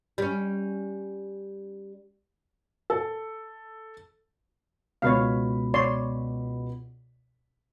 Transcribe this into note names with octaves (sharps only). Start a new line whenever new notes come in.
G3 C#4
A4
C#2 B2 C#5 F5 B5
C#5 D5 C6